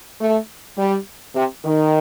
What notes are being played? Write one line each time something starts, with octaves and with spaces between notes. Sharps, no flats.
A3
G3
C3
D#3